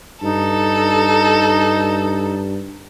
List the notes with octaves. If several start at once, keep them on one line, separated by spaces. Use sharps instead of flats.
G2 D#4 A4